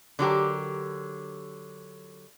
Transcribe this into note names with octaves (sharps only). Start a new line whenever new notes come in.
D3 F#3 G4 A#4